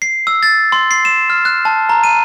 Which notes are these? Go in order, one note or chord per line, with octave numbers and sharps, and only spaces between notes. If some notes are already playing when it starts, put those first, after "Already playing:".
C7
E6
A6
C6
C7
E7
F6
F#6
A5
A#5
D#7